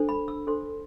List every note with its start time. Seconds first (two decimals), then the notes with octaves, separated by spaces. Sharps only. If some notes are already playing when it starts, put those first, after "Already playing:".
Already playing: D4 A4 C5
0.09 B5
0.28 E6
0.47 D4 A4 C5 C6